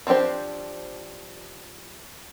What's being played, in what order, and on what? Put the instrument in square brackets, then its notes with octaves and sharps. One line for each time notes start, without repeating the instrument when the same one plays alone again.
[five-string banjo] F3 C4 D4 G4 C5